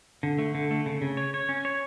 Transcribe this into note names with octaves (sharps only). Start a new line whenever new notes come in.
D3
A3
D3
A3
C#3
C#3
C#5
C#5
C#4
C#5